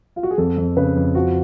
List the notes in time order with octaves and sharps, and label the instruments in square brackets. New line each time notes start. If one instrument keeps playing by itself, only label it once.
[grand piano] F4
F#4
G#4
F2 A4
F2
C#3 B4
F2
F3 F#4